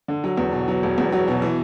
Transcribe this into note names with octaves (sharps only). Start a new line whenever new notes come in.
D3
F#3
E2
B2
F#3
E1
E2
F#3
B2
E3